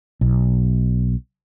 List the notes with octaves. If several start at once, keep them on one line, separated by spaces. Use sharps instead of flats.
B1